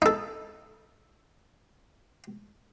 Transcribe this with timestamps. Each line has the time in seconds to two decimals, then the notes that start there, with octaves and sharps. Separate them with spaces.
0.02 D#4 A4